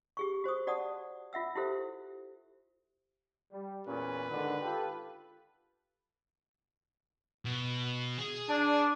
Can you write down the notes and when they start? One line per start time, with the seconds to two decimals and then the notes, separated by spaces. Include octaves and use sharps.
0.17 G4 G#4 C#6
0.44 F#4 C5 C#6 D#6
0.67 F#4 D5 F#5 A5 D#6
1.33 F4 E5 F#5 E6
1.55 E4 F#4 G4 A4 C5 E5
3.52 G3
3.87 E2 A#2 C#4 B4
4.31 G#2 D3 D#3
4.62 F4 G4 A4
7.45 B2
8.18 G#4
8.49 D4